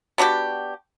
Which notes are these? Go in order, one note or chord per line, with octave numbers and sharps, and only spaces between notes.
B3 D4 F#4 G4